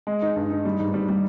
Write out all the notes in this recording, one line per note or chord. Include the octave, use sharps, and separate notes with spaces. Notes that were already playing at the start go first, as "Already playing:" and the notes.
G#3
D#4
G2
D#4
G3
G#2
G3
G3